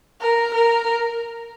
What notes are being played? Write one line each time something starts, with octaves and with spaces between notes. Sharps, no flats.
A#4
A#4